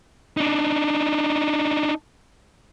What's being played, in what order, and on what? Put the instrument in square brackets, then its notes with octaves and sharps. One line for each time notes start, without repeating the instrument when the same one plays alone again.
[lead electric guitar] D4 D#4